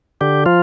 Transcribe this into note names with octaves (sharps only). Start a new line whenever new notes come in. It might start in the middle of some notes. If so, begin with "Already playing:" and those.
D3 G4
F3 F4